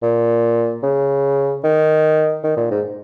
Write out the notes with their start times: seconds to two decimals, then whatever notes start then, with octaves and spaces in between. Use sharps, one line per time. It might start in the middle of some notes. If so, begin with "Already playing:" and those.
0.03 A#2
0.83 C#3
1.64 D#3
2.44 D#3
2.57 A#2
2.71 G#2